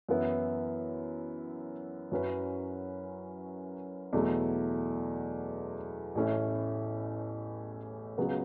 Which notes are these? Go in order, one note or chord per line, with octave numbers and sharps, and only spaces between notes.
F#2 E3 B3 E4
F#2 F#3 C#4 E4 B4
E2 B2 F#3 A3 E4
A1 A2 A3 C#4 E4
C#2 C#3 F#3 B3